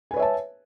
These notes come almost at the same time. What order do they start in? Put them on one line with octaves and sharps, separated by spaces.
G#5 B4 C#5 E5 A5